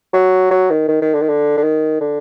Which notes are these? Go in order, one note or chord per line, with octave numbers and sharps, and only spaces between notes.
F#3
F#3
D#3
D#3
D#3
D3
D#3
D3
D3
D#3
D3